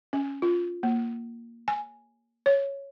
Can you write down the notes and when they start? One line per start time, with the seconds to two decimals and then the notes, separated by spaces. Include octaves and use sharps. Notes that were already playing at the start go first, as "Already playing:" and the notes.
0.13 C#4
0.42 F4
0.83 A#3
1.68 G#5
2.46 C#5